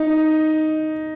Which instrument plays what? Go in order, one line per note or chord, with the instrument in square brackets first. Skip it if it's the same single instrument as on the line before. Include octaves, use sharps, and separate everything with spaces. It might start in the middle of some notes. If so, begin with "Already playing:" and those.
Already playing: [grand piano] D#4